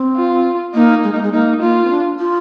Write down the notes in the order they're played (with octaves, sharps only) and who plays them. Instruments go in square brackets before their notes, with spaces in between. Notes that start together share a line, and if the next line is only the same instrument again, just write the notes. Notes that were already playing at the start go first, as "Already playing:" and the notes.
Already playing: [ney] C4
[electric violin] F4
[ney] A#3 [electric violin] D#4
[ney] G#3
A#3
G#3
[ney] A#3 [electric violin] D#4
[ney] A#3 [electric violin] F4
[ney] C4
D4
F4